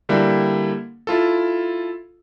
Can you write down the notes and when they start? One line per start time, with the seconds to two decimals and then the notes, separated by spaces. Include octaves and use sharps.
0.09 D3 G3 A#3 E4
1.07 E4 F4 A4